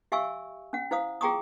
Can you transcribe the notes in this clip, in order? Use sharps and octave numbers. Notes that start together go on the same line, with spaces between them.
G4 E5 F5 G#5 C#6 E6
C#4 F#5
E4 C5 F5 D#6
F4 G#4 G5 A#5 C#6 D#6